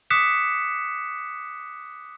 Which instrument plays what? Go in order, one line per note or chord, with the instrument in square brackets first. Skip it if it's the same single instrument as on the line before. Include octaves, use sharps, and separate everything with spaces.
[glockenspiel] D6 D#6 F#6 B6 C#7 E7